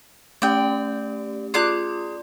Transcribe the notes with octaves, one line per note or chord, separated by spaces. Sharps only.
A3 C#4 G4 D5 G5
F4 G#4 D5 C6 D6 F#6